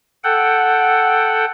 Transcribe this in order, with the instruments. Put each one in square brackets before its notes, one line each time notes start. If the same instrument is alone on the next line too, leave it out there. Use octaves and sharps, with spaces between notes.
[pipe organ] A4 F#5 G5